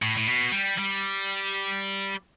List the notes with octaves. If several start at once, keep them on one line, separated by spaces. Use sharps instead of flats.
A2
A2
B2
G3
G3